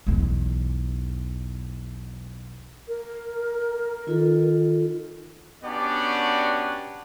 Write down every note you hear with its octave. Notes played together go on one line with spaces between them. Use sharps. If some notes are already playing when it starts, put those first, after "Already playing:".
B1 E2
A#4
D#3 F4 A4
B3 C#4 D4 F#4 G4 D5